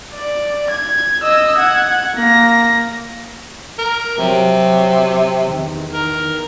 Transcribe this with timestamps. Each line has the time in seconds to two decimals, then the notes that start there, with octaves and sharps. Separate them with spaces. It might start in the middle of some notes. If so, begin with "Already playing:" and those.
0.14 D5
0.71 G#6
1.24 D#5 E6
1.58 F#5 G#6
2.16 A#3 A#6
3.79 A#4
4.18 C3 F#3
5.42 E2 D#3
5.93 A#4